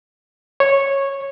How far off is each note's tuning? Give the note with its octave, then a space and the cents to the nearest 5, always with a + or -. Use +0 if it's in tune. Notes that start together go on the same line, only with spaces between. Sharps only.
C#5 -10